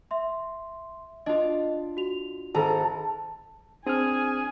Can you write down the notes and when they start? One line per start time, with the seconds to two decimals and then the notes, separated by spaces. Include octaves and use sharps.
0.11 E5 C6
1.26 D4 F4 D#5
1.97 F#4 F7
2.54 G#1 A4 A#5
3.87 C4 D4 G#4 G#5 F6